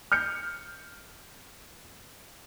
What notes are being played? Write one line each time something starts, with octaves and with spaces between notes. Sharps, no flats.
F6 G6 C#7